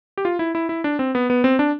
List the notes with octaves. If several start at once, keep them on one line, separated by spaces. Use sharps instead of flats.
G4
F4
E4
E4
E4
D4
C4
B3
B3
C4
D4